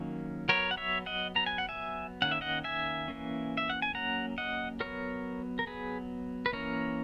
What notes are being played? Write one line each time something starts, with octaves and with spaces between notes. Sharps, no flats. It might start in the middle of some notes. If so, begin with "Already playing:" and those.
Already playing: D#3 F#3 A#3 C#4
F#3 B3 A#4 C#5
F#5
C#5 E5
D#5 F#5
F#3 B3 A#5
G#5
F#5
E5 G#5
D#3 A#3 C#4 F#5
E5
D#5 F#5
E5 G#5
E3 A#3 C#4
E5
F#5
G#5
F#3 A#3 C#4 F#5 A#5
D#5 F#5
F#3 B3 A#4 C#5
A#4
F#3 B3 G#4 B4
B4
E3 A#3 C#4 A#4 C#5